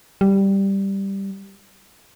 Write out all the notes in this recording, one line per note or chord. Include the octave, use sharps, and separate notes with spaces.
G3